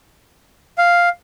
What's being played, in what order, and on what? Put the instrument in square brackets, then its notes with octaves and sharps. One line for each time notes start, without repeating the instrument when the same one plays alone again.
[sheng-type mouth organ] F5